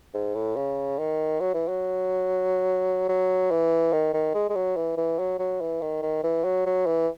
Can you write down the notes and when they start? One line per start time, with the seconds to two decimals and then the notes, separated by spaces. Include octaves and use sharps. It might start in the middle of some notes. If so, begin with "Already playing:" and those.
0.14 G#2
0.35 A2
0.56 C#3
0.99 D#3
1.40 F#3
1.54 E3
1.68 F#3
3.09 F#3
3.51 E3
3.93 D#3
4.13 D#3
4.34 G#3
4.49 G#3
4.55 F#3
4.76 E3
4.97 E3
5.19 F#3
5.39 F#3
5.61 E3
5.81 D#3
6.02 D#3
6.24 E3
6.44 F#3
6.66 F#3
6.86 E3